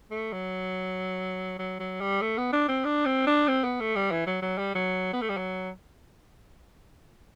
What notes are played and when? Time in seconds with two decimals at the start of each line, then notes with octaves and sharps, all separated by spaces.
0.11 A3
0.33 F#3
1.59 F#3
1.79 F#3
2.01 G3
2.21 A3
2.38 B3
2.53 D4
2.69 C4
2.85 D4
3.06 C4
3.27 D4
3.48 C4
3.64 B3
3.80 A3
3.96 G3
4.11 E3
4.27 F#3
4.42 F#3
4.58 G3
4.75 F#3
5.13 B3
5.22 A3
5.29 G3
5.37 F#3